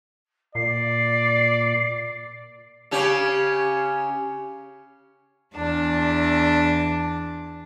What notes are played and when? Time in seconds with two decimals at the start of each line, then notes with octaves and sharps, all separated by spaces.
0.55 A#2 D5 C7
2.91 C#3 C#4 G4
5.55 E2 D4 A5